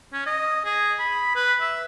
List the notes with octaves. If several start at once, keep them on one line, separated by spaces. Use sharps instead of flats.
C#4
D#5
G#4
B5
B4
E5